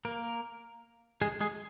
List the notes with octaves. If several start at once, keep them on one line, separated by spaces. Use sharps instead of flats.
A#3 A#4
G#3 G#4
G#3 G#4